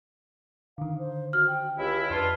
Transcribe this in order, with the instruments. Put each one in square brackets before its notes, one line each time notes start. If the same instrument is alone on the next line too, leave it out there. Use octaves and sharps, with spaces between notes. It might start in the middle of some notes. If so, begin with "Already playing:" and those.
[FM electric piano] D3 D#3 [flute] F5
[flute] C5
[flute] F#4 [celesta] F6
[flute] G5
[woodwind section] C#2 E4 [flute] G4
[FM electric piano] F2 [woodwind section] D4 F4 [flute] B4